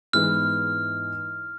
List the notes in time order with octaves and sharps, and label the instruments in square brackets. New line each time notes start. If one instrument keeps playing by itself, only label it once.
[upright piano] G#2 E3 G#3 B3 [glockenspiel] F6